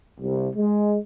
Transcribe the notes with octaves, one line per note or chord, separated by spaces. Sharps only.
C2
G#3